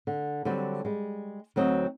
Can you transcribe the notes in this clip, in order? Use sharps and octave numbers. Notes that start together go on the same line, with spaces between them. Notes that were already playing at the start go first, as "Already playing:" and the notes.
D3
D3 F#3 G3 C4
G3 G#3
D2 F#3 C4 D#4 D#5